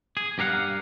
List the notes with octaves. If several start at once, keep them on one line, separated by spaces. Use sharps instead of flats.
G#4
G2 G4 A#4 F5 F#5